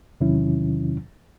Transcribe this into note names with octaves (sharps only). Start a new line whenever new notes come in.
E2 C3 D#3 F#3 C#4 E4